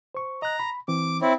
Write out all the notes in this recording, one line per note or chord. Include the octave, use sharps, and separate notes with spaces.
C5 C#6
D#5 A#5 F#6
B5
E3 C4 D6
C4 E4 C#5